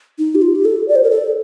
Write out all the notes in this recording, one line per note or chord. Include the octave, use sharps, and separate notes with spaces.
D#4
G4
F4
G4
A4
D5
C5
A#4
A4